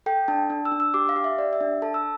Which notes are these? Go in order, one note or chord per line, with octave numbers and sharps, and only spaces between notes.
A4 G5
D4 A5
D4
E6
D4
E6
G4 D6
F5
G4
E5
G4 D5
E5
D4
A4 A5
E6